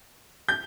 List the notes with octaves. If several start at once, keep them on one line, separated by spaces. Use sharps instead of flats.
G6